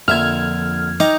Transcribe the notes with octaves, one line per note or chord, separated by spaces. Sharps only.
A#1 F2 D3 E5 F6 G#6
D#4 G5 A#5 D6